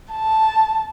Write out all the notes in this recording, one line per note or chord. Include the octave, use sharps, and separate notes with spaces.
A5